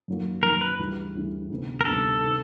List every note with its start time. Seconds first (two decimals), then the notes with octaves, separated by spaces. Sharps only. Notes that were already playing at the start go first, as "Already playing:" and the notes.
0.08 F#2 D#3 F#3 A#3
0.43 F#2 D#3 F#3 A#3 A#4
0.61 B4
0.79 D2 C#3 E3 G3
1.15 D2 C#3 E3 G3
1.50 D2 C3 D#3 G3 B3
1.81 A#4
1.85 D2 C3 D#3 G3 B3 A4
2.23 C3 D#3